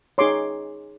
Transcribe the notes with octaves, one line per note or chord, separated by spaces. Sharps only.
D#4 G#4 C#5 C6 D6